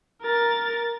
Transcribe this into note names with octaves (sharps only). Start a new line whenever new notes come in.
A#4 A6